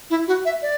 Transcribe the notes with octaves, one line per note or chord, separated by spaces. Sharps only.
E4
F#4
E5
D5